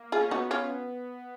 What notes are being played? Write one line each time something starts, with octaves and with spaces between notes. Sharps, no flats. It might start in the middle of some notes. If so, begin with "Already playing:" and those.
Already playing: A#3
F4 G#4
C#4
B3 D#4 F#4
C#4 F4